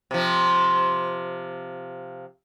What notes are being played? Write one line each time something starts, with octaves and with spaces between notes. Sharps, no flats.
C3 F3